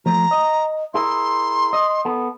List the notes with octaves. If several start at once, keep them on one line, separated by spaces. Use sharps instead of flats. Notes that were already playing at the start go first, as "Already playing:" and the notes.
F3 A3 A#5
D#5
E4 G#4 A#4 C6
D#5
B3 A4